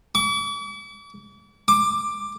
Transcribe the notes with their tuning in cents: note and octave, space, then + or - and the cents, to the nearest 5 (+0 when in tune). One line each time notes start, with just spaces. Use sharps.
D6 -45
D6 +10